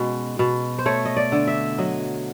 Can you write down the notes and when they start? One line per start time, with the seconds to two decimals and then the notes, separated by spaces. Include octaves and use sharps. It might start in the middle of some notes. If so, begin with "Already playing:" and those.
Already playing: B2 G#3 C#4
0.39 B2
0.78 C5
0.86 A3 C#5
1.05 D#5
1.17 D5
1.32 D3
1.48 E5
1.78 F#3 D#5